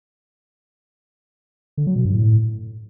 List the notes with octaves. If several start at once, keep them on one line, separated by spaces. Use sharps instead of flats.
D3
F#3
B2
G2
A2